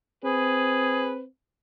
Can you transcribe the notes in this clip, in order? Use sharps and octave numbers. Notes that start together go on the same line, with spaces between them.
C4 G#4 B4